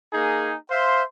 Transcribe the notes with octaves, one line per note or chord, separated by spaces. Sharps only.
A#3 D#4 G#4
C5 E5 F5 C6